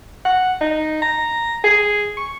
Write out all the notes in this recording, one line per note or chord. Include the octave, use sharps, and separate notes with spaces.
F#5
D#4
A#5
G#4
C#6